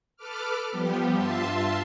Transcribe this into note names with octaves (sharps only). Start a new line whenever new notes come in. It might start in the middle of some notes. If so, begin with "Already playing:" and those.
A4 B4 D6 F6
F3 G3 B3 G4
G2 F4 E5 A5 C6